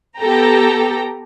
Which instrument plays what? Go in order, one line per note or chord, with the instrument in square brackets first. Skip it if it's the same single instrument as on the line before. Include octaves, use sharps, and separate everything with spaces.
[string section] B3 G4 A4 G5 A#5